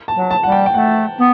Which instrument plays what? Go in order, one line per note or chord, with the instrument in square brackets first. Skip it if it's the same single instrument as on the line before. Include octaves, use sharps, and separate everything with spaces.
[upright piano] A5
[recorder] F#3
[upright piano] A5
[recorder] G3 [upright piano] F#5
[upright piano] G5
G5
[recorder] A3 [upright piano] F#5
[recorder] B3